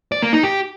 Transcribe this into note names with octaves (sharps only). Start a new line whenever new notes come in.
D5
A#3
D#4
G4